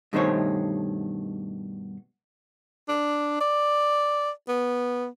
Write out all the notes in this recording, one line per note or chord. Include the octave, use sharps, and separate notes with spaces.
G2 B2 D#3 A3 C5 C#5
D4
D5
B3